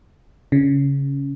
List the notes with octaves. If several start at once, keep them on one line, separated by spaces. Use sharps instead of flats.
C#3